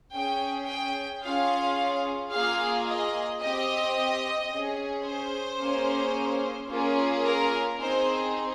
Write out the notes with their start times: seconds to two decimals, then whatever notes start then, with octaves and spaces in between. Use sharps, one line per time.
0.13 C#4 G#4 G5
0.68 G5
1.22 C#4 F4 G#4 F5
2.32 A#3 F4 G#4 F5
2.86 D#5
3.41 C4 G4 D#5
4.51 C#4 G#4
5.05 C5
5.60 A#3 C#4 G#4
6.69 A#3 C#4 F4 G#4
7.24 A#4
7.79 C4 D#4 G#4 C5